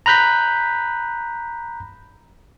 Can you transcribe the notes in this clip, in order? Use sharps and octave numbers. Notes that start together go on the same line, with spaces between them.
A#5 B5 F#6 G6 B6